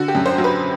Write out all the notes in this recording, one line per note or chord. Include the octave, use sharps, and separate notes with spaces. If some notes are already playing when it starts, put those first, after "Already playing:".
Already playing: D3 F#4
G4
F#2
C5
F#3
B4